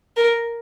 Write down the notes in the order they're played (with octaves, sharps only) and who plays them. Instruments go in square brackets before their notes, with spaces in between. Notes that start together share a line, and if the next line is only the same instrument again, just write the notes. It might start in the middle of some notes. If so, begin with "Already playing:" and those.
[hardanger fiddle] A#4